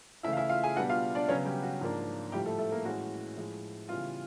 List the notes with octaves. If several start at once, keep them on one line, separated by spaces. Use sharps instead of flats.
C#3 E3 A3 E4 E5
F5
E4 E5
F4 F5
G#4 G#5
B2 G3 B3 D4 F#4 F#5
F4 F5
D4 D5
C#3 F#3 B3 C#4 C#5
G3 G4
F#4
G#2 F3 A#3 D4
A2 F3 G3 A3 G4
A3 A4
A3 A4
A#3 A#4
A2 E3 G#3 C#4 F#4
A2 F3 G#3
C#3 E3 G3 B3 F4